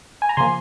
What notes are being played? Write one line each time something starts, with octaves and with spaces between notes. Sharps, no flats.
G#5
A#5
C#3 F3 A#3 G#5 C6